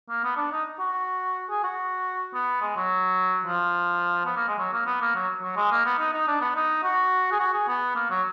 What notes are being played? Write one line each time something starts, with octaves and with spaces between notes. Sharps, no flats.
A#3
B3
D4
D#4
F#4
G#4
F#4
B3
G#3
F#3
F3
B3
A#3
G#3
F#3
A#3
B3
A#3
F#3
F#3
G#3
A#3
B3
D#4
D#4
D4
B3
D#4
F#4
G#4
F#4
G#4
B3
A#3
F#3